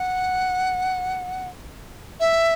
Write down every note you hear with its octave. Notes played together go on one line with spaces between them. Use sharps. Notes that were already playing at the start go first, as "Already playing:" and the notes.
Already playing: F#5
E5